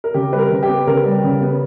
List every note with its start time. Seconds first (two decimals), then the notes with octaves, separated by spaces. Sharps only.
0.04 A#4
0.14 C#3 G4
0.33 G3 B4
0.38 A#4
0.50 C#3
0.63 G4
0.69 B3
0.87 C#3 A#4
1.05 G3
1.24 C#3
1.42 B3